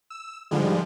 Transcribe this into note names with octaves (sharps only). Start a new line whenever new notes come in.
E6
G#2 D3 F3 G3 G#3